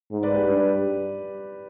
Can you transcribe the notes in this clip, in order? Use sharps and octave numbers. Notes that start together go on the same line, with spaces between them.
G#2
B4 D5
G4 B4
G2